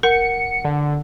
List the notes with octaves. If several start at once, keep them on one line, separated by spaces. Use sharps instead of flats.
A#4 F#5 C#7
D3